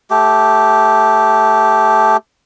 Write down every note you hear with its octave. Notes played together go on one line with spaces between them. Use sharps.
A3 G4